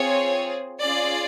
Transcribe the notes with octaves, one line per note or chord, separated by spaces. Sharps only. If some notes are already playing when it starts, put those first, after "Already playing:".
Already playing: C4 F4 G#4 C#5
C#4 F4 G#4 D5